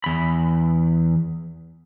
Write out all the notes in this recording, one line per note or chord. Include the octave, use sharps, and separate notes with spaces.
E2 B5